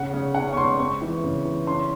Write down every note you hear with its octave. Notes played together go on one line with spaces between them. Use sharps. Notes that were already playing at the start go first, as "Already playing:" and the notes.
Already playing: C#3 F#5
C#3
C#4 F#5
C#6
G#3 C6
C4 C#6
E3
C#3
E3
C#4 C6